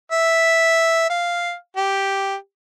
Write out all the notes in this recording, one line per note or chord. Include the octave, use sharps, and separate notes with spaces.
E5
F5
G4